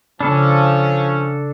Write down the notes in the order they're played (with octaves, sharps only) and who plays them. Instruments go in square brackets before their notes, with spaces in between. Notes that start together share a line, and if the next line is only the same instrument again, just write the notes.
[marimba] C#3 B5 [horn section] F3 C#4 [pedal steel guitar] D4 A4